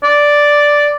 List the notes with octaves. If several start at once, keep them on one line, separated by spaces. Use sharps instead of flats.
D5